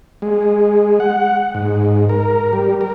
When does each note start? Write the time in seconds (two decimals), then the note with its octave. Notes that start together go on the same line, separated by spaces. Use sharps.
0.22 G#3
1.00 F#5
1.55 G#2
2.09 A#4
2.53 G3
2.81 A#4